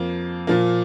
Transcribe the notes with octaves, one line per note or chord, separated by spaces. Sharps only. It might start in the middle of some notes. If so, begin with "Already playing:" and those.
Already playing: F2 F3 A#3
A#2 F3 A#3